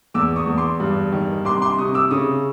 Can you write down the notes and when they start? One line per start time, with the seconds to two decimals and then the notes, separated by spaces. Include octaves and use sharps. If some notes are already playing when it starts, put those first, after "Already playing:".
0.14 E2 D6 E6
0.36 C#6 D#6
0.47 E2
0.57 C6 D6
0.80 G2
1.12 D#3
1.45 C2 C6 D6
1.62 C6 D6
1.78 C3 C#6 D#6
1.94 D6 E6
2.11 C#3 C#6 D#6